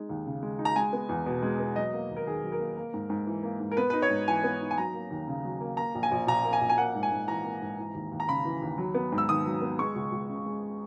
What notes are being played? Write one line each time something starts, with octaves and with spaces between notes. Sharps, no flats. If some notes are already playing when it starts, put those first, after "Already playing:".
Already playing: G#3 D#4
D#2
C#3
G#3
D#4
A#5
G#3 G#5
B3
E2
B2
G#3
B3
F#3 D#5
A#3
D#2
A#4
D#3 G#4
F#3
A#4
A#3
A#3
G#2
G#2
E3
A#3
G#2
A#4
B3 B4
D#4 B4
C#5
G#2
E3 G#5
B3
D#4
G#5
F#3 A#5
A#3
D#2
C#3
F#3
A#3
A#3 A#5
A#1
G#5
A#1
A#2 A#5
A#3
G#5
A#1
G#5
A#3 F#5
G#2
G#5
G#2
E3 A#5
A#3
G#2
E3
D#2
D#2
A#5
C#3 B5
E3
D#2
F#3
B3
G#2
E6
D#3 D#6
F#3
B3
G#3 C#6
C#2
C#2
C#3
G#3